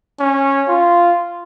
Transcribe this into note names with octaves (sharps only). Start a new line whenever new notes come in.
C#4
F4